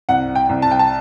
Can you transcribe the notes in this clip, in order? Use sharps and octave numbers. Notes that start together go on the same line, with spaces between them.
C2 F#5
G5
C2
A5
G5
A5